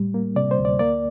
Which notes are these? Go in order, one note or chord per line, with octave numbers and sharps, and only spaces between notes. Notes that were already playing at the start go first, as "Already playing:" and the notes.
Already playing: A2 G3
A#3
C3 D5
C5
D2
D5
A#3 D5